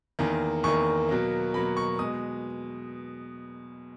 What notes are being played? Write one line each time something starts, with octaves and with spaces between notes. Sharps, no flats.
E2 D#3 A#3
E2 D#3 A#3 C#6
B2 F#3 A#3
B2 F#3 A#3 B5
C#6
B2 G#3 D#6